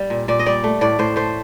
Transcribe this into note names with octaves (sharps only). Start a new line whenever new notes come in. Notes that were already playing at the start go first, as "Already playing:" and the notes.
Already playing: G3
A#2
A#2 D5
D#5
G3 D5
A3
A2 D5
A2 C5
A3 C5